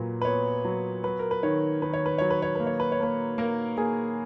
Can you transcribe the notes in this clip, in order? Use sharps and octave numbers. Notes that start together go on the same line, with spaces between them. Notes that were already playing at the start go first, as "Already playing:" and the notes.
Already playing: A#2 F#3 B4
B4
B3 C#5
F#3
F#3 B4
A#4
B4
D#3 C#5
D#3 B4
C#5
B4
F#3 C#5
B4
C#5
A#3 B4
C#5
B4
C#5
A#3 B4
A#3 A#4
A#3 G#4